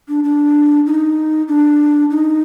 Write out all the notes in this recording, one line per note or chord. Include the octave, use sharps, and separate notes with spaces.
D4
D4
D#4
D4
D#4